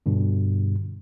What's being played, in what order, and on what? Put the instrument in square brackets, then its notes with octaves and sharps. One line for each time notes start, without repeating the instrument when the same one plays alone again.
[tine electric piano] G2 B2 D3